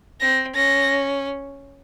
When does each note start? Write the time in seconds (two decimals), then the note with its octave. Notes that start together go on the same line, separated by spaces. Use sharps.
0.21 C4 A#6
0.55 C#4 A#6